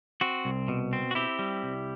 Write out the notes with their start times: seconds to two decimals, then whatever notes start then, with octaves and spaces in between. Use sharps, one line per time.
0.21 C4 F#4
0.45 C2
0.68 B2
0.93 C4
1.11 F#4
1.15 C4 E4 G4
1.39 G3
1.63 C2